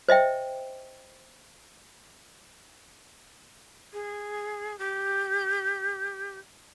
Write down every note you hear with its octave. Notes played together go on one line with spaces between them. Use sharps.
C5 D#5 E5 G5
G#4
G4